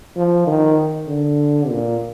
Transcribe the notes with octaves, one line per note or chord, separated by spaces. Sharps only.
F3
D#3
D3
A#2